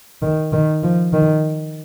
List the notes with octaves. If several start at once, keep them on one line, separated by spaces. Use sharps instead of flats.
D#3
D#3
F3
D#3